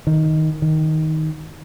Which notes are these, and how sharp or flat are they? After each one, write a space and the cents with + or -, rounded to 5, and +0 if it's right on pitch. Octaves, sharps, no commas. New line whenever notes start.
D#3 +10
D#3 +10